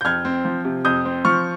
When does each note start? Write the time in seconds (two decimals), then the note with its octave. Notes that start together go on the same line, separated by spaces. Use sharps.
0.01 G6
0.05 F2 F6 G#6
0.25 C4
0.45 F3
0.65 C3
0.85 F2 D#6 G6
1.05 C4
1.25 F3 C#6 F6